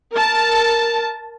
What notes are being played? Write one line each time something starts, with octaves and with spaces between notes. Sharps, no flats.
A#4 A5